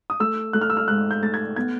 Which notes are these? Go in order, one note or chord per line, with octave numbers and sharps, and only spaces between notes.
D#6
A3 E6
A3 F#6
F6
E6
F6
G#2 F#6
G6
A3 A6
G#6
B3 G#6